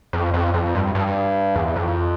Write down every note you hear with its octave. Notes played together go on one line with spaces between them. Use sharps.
F2
F2
F2
G2
G2
E2
F2